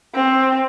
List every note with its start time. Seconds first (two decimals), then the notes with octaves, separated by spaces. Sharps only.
0.15 C4